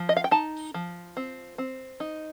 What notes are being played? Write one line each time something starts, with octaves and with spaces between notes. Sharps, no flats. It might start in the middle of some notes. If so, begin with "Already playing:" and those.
Already playing: F3
D#5
F5
G5
D#4 A5
F3
C4
C4
D#4